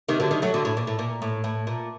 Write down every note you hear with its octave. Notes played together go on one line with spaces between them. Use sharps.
C3 D#3
D3 F#3
D#3 G3
F#3 A3
D3 F#3
A2
A#2
A2
A#2
A2
A2
A#2